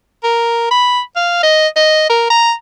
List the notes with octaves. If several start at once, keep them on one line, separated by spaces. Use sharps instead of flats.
A#4
B5
F5
D#5
D#5
A#4
A#5